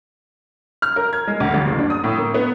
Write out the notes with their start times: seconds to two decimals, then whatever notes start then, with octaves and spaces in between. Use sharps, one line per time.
0.82 F6
0.96 A#4
1.13 G#6
1.27 G#3
1.40 D2
1.54 A1
1.66 F#1
1.78 D4
1.90 D#6
2.04 A2
2.18 A#3
2.34 B3